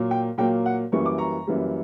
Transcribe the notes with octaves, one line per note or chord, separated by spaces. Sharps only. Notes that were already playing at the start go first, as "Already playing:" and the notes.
Already playing: A#2 F#3 A#3
G5
A#2 F#3 A#3 G5
F#5
F#2 E3 G3 A#3 C#6
D6
A#5 C#6
F#2 E3 G3 A#3